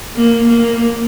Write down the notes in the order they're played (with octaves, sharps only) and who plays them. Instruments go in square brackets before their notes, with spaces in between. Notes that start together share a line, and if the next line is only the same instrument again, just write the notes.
[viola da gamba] A#3
A#3